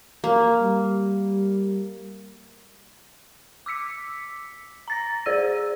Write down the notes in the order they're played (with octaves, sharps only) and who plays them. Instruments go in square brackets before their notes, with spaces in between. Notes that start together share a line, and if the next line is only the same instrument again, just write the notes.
[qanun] A#3
[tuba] G3
[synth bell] D6 E6 B6 C#7
A#5 A6 A#6
G#4 C5 D5 E6 D#7